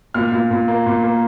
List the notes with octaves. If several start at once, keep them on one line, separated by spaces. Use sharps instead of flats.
A#2 F6
A#2
A#2
A#3
A#2
A#3